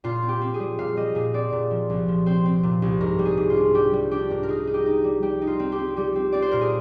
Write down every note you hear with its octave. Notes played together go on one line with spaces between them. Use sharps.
A#2 F4
C4
G4
C4
G#4
G3
A#2 F5
G3 D#5
A#2 G#4
C4 D5
A#2
F3
C2
F3
C4 C5
C4
A#2
C2
G#2 A#4
G3
G#4
G#2
F4
D4
G3 G4
G3
D4 G4
G#2 A#4
A#4
D#4 G#4
D#4
G4
D#4
G3
G3 G4
D#4
F4
C4
G4
C4
G3 G4
C4
C4 D5
C5
A#2 A#4
G#4